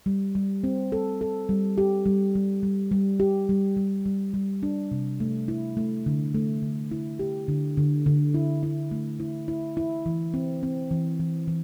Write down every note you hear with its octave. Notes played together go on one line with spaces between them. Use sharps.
G3
G3
C4
A4
A4
G3
G4
G3
G3
G3
G3
G4
G3
G3
G3
G3
D4
C3
A3
E4
A3
D3
A3
D3
E4
G4
D3
D3
D3
E4
E4
A3
E4
E4
E4
E3
C4
C4
E3
E3
E3